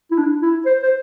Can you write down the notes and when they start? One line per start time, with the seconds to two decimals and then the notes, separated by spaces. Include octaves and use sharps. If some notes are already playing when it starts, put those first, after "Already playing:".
0.11 E4
0.18 D4
0.42 E4
0.66 C5
0.83 C5